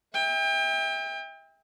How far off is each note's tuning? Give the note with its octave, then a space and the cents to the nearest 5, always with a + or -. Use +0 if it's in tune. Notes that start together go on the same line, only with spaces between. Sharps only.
E5 -30 G5 +35